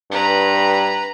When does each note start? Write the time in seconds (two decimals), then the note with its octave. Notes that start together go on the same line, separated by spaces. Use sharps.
0.11 G2 B4 A#5